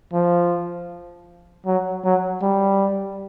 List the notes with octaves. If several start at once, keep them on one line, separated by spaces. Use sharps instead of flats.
F3
F#3
F#3
G3